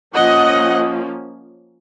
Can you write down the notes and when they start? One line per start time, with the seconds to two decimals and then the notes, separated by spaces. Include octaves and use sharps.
0.14 F3 A#3 C#4 D#5 F#5